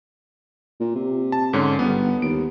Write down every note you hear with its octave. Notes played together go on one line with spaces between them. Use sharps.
A#2
C3
A5
G#2 D3 C#4
G1 B3
D#2 D7